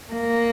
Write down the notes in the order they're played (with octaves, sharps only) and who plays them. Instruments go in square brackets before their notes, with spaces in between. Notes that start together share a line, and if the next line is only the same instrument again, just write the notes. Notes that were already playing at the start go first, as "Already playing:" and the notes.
[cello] A#3